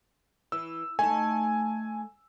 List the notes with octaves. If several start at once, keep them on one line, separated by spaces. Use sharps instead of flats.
E3 E6
A3 D#4 A4 G#5